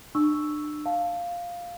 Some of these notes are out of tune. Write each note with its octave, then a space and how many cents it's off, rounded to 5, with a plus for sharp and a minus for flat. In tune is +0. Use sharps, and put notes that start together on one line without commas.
D4 +35 C#6 +0 E6 +0
F5 +0 A5 +0